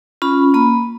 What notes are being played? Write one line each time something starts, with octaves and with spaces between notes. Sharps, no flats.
C#4 F4 B5
A#3 B5